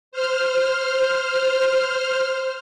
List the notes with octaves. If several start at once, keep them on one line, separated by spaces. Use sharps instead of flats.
C5 F6